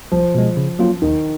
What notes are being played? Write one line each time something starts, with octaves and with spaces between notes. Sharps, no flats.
B1 F3
B2 G#3
C#3
F#3 A#3 C#4 F4
D#2 D#3